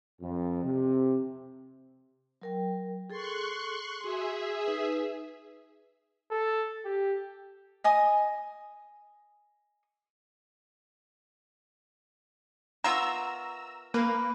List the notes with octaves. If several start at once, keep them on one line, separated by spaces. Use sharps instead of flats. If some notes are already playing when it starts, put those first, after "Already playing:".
F2
C3
F#3 A#4 G5
G#4 A4 C6 C#6 F#6
F#4 G#4 E5 C6
D#4 B4
A4
G4
D#5 G#5 D#6
B3 F4 A#4 E5 A#5 C#6 E6
A#3 B4